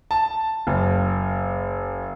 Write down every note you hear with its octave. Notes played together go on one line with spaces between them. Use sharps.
A5
F#1